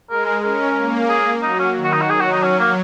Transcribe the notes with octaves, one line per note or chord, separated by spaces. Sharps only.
G#3 A#4
A#4
C#4 A#4
A#3
G#4
F#3 D#4
C#4
D#3
F#4
D#4
F#4
F#3 G#4
F#4
D#4
C#4
A#3